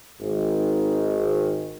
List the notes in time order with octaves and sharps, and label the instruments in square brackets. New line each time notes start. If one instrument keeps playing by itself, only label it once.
[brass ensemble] G#1 D#3